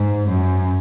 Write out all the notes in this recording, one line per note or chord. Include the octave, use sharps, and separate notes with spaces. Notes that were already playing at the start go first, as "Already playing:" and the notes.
Already playing: G#2
F#2